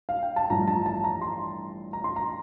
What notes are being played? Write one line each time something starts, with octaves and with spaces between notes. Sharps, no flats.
F5
G5
A5
A1 G2 F3 A#5
A5
A5
A#5
C6
A#5
C6
A#5